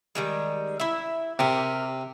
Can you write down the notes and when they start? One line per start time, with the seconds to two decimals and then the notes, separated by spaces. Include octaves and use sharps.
0.15 D#3 G3 G#3
0.80 E4 E5
1.39 C3 G4 A#4